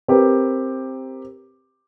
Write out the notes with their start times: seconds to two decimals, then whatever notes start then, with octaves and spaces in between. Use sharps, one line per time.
0.08 C4 G4 A#4 B4